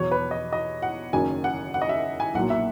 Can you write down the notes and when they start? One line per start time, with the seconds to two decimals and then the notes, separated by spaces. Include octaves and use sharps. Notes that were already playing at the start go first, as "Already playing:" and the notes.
Already playing: E2 B2 F#3 C#5
0.12 B4
0.31 D#5
0.53 D#5
0.82 F#5
1.13 F#1 F#2 D#3 F#3 G#5
1.44 F#5
1.74 F#5
1.82 D#5
1.89 E5
2.20 G#5
2.35 B1 A#2 F#3 F#5
2.50 E5